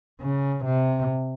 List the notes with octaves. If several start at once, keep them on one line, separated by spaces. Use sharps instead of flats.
C#3
C3